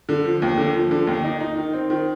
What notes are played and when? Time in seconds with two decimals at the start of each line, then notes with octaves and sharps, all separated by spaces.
0.09 D3
0.24 F3
0.42 D#2
0.57 D3
0.74 F3
0.91 D3
1.07 D#2
1.24 D#4
1.40 D#4
1.57 D#3
1.73 C4
1.90 D#3